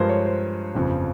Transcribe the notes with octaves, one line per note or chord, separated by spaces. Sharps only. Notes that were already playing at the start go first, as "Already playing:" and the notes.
Already playing: G2 F3 G#3 A#4 C5
C#5
C5
G1 F2 C#3 F3